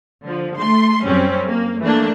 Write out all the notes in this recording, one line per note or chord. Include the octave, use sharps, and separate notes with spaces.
D3 F3
A3 C6
F#2 G3 C4 C#4
A#3
E3 A3 A#3 D4